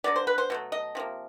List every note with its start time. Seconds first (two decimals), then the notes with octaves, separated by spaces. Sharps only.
0.04 D3 F#3 B3 D5
0.16 C5
0.27 B4
0.38 C5
0.50 B2 F#3 A3
0.72 D#5
0.95 C3 F3 A#3